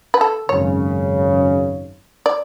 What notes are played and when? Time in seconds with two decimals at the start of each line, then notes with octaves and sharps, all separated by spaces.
0.14 B4
0.21 A4
0.49 G#1 F#2 C#3 C#5
2.26 D5